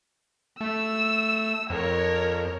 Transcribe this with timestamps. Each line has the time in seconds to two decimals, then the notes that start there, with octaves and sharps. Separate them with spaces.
0.61 A3 E6
1.70 F2 A#4 C#5